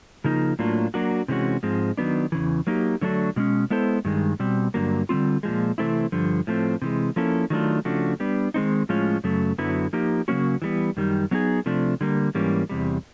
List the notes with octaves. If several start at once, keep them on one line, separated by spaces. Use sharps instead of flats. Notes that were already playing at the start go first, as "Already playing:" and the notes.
C#3 F3 A#3 D#4
A2 F#3 A#3 D4 F4
F#3 A#3 D4 F#4
C3 E3 G#3 C#4 F#4
G#2 F3 G#3 C4
D#3 F#3 B3 D4
E2 C#3 E3
F#3 A#3 D#4 G4
D3 F#3 A3 D4 F#4
B2 G#3 C#4
G#3 B3 E4 A4 C5
G2 D#3 G#3
B2 G3 C4
G2 D3 F#3 A#3
D3 G3 C4 F4
A#2 F3 G#3
C3 E3 A3 C4 E4
G2 D3 F3
A2 F3 A3 C4
C3 E3 G#3
F3 A#3 C#4 E4 A4
D#3 F#3 A3 D4 F4
C#3 F3 A3 D4 F#4
G3 B3 D4
D#3 G#3 C4 D#4
A2 F3 G#3 C#4 F4
F#2 C#3 F#3 A3
F#2 D3 F#3 B3 E4
F3 A#3 D#4 G4
C#3 F#3 A#3 C#4 F#4
E3 G3 B3
F#2 D#3 G3
F#3 B3 D#4 G#4
C3 F3 A3 D4
D3 G3 A#3
G#2 E3 G3 A#3 C#4
E2 C3 G3